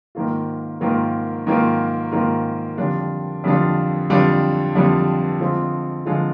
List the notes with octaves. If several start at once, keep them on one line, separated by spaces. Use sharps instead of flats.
G#2 D#3 A#3 F4
G#2 D#3 A#3 F4
G#2 D#3 A#3 F4
G#2 D#3 A#3 F4
F2 D3 G3 D4 F4
F2 D3 G3 D4 F4
F2 D3 G3 D4 F4
F2 D3 G3 D4 F4
D3 F3 G#3 C4 F4
D3 F3 G#3 C4 F4